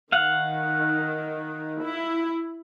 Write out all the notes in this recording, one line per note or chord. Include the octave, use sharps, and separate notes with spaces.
D#3 F5 F#5
E4